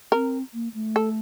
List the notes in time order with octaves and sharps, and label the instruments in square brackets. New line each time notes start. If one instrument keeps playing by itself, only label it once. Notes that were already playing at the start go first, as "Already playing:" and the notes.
[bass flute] C4 [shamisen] A#4
[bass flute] A#3
A3
[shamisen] A4